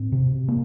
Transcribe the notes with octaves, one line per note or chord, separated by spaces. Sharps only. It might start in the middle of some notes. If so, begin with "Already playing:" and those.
Already playing: A2 C4
C3
A#3